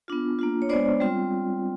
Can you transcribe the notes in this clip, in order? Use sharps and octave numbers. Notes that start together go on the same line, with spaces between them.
B3 D4 F4
A#3 D4 F4
C#5
G#3 B3 D4 C5 D5
G3 C4 F4